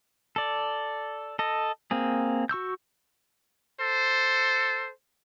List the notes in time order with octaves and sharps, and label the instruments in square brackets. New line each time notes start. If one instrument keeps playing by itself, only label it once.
[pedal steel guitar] A4 D5
A4 D#5
A#3 C4 G#4
F#4 C#6 E6 G6
[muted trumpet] A4 [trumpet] C5